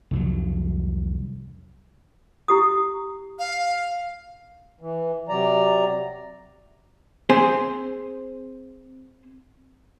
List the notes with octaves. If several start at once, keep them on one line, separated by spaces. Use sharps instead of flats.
C2 F2 F#3
E4 G4 D#6
F5
E3
C3 F#3 D5 A#5
C4 G#4 C5 G#5 C6